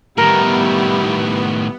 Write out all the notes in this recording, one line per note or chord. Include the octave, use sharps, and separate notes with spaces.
A2 D#3 G3 B3 E4 A#4